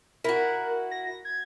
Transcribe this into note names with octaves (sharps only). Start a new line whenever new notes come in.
E4 F#4 A#4
A#6
G#6